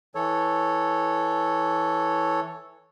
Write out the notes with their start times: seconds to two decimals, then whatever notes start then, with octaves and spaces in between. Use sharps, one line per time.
0.15 E3 A4 C#5